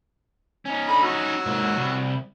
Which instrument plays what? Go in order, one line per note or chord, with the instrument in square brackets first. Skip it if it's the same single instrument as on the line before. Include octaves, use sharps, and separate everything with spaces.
[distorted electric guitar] C#4 D#4
[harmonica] D3 B5
F#3 F#4 E6
[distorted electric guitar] G#2 A#3
C2